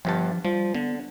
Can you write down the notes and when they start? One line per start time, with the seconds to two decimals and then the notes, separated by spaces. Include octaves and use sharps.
0.05 G1 G2 F3 A5
0.45 F3 G3
0.75 D3 B3